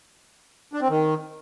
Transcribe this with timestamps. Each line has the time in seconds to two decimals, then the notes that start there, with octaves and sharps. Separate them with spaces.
0.73 D4
0.81 C4
0.89 D#3